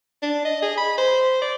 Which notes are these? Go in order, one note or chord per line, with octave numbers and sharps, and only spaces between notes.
D4
D#5
G#4
B5
C5
D5